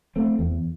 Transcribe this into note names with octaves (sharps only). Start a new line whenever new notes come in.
A3 C4
E2